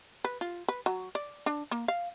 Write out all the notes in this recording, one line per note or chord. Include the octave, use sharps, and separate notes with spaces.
B4
F4
B4
F#3
D5
D4
A#3
F5